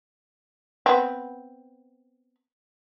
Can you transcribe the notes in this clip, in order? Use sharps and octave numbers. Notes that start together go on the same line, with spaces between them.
B3 C4